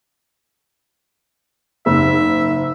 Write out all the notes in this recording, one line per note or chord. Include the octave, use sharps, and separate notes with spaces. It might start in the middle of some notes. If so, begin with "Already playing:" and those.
F#1 G#2 E5 E6